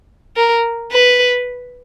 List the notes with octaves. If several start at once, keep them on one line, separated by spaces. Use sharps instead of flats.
A#4
B4